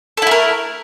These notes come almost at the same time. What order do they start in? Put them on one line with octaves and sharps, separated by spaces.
A4 E4 A3 A#4